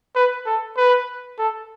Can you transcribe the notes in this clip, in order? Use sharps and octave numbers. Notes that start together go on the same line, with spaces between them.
B4
A4
B4
A4